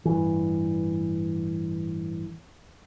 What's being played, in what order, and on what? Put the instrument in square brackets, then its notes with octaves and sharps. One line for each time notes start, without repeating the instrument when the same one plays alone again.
[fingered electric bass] A1 G2 E3